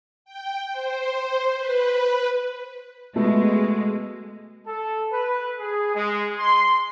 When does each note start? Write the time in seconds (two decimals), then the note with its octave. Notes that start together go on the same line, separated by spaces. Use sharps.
0.25 G5
0.72 C5
1.57 B4
3.16 B2 G#3 A3
4.67 A4
5.11 B4
5.59 G#4
5.95 G#3
6.38 C6